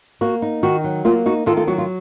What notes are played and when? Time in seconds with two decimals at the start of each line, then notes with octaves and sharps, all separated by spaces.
0.21 A#3 F#4
0.42 D#4
0.63 D#3 F#4
0.84 F#3
1.05 A#3 F4
1.26 D#4 F#4
1.46 D#3 F4 A4
1.57 F4 A4
1.67 F#3 F#4
1.78 F4